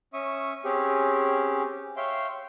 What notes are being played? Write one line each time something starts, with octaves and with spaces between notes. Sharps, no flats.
C#4 E5 C#6 D#6
C4 C#4 G4 G#4
C#5 E5 F5 G5 C6